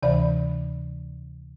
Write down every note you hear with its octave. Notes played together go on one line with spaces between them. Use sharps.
D2 C3 E3 D5 B5